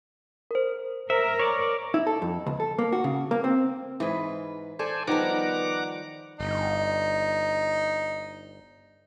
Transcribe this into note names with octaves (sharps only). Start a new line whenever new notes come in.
A#4 C5
A#4 C5 E5
C#5 D5
E4
A4
F2
C#2
A4
A#3
F#4
C#3
A#3
C4
G#2 E3 G#4 B4
A4 C5 D5 G#5
D#3 F3 G3 B3 A#4 F#5 A#5 D6
G1 D#4